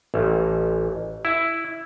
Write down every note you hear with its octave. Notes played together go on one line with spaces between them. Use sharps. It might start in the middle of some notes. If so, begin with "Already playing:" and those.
A1
E4